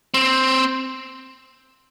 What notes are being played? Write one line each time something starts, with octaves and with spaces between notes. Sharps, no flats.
C4